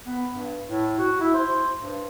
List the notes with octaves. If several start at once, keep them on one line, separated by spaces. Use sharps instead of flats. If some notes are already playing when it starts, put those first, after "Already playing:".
B3
G2
A2
F#4
E4
C5
G2